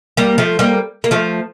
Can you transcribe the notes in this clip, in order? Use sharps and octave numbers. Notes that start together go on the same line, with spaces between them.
G3 A#3
F3 A3
G3 A#3
A#3
F3 A3